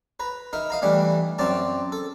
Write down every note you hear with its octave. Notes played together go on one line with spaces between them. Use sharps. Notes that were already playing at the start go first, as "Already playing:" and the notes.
B4 A#5
D#4 A#4 E5
D#5 F5 A#5
E3 G3 A3 D4
F#2 C4 D5 A5 A#5
A4